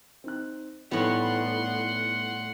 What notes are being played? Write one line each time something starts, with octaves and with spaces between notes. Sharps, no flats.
C4 D#4 F#6
A2 E3 G3 B3 D#4 F#5 C6